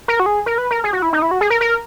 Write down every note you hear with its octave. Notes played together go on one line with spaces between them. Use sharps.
A#4
F#4
G#4
A#4
B4
A#4
G#4
F#4
E4
D#4
E4
F#4
G#4
A#4
A#4